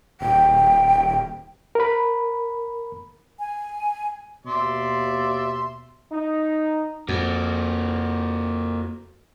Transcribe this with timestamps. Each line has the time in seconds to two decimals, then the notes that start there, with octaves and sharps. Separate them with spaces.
0.21 D#1 G5
1.75 A#4 B5
3.39 G#5
4.46 D#2 B2 D5 E5 C6
6.12 D#4
7.09 F2 A#3 F#4